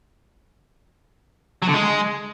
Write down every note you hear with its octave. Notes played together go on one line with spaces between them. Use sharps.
F#3
D3
G#3